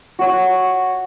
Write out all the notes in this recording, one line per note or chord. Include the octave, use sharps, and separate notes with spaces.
F#4 C#5